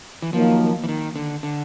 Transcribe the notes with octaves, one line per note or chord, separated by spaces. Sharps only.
E3
D#3 F3 F#3 A#3
E3
D#3
D3
D3